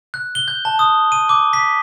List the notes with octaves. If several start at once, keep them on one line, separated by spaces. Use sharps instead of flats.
F#6
G7
G6
A5
D#6
D#7
D6
B6